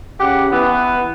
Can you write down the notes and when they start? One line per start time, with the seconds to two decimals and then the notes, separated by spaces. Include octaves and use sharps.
0.20 C#3 G4 F#5
0.52 E3 B3